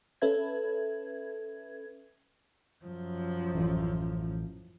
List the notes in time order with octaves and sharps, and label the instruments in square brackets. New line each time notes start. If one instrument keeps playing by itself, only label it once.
[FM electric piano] C#4 A4 B4 E5 G#6
[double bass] F#2 F3
[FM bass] A1